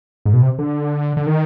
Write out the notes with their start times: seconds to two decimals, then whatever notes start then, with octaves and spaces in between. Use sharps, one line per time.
0.25 G#2
0.34 B2
0.42 C3
0.59 D3
1.17 D3
1.27 D#3